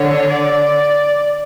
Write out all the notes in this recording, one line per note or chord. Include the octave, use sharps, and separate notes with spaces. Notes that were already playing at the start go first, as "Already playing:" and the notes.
Already playing: D3 C#5
D5